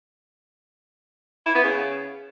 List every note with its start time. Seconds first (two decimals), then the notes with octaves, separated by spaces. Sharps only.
1.46 E4
1.55 B3
1.63 C#3